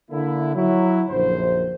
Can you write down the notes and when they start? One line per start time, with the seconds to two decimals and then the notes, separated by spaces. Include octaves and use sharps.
0.11 D3 A#3 E4
0.54 F#3 E4
1.09 A#1 F#2 D3 C5